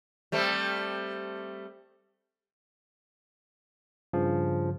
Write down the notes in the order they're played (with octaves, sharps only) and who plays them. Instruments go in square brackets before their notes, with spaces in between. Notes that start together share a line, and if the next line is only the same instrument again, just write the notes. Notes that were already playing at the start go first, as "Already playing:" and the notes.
[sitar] G3 A3 C4
[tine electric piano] G2 C#3 F3